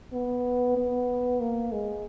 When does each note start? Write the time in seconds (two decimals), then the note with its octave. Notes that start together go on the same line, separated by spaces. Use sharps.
0.13 B3
0.77 B3
1.40 A#3
1.72 G#3